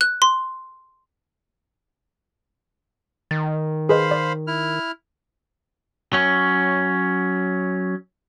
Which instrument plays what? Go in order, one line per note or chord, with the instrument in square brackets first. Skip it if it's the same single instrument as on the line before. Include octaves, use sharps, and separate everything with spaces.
[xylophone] F#6
C6
[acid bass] D#3 [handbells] A6
[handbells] G#4 B4 D#5 [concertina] C5 F5 B5
[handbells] D5
[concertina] E4 F6
[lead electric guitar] F#3 C#4